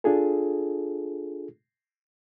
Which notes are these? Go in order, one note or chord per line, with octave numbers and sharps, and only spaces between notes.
D4 F4 G#4 A4